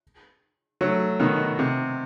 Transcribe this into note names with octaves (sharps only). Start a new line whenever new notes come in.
F#3 A3
B2 D#3
C3